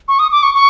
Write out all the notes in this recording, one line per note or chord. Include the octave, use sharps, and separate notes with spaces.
C#6
D#6
D6
C#6
C#6